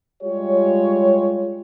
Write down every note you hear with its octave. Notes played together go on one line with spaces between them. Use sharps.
G3 G#3 F4 G4 C#5